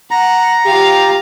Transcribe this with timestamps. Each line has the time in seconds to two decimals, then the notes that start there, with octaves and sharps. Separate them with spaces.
0.11 F#5 A#5
0.66 F4 G4 F5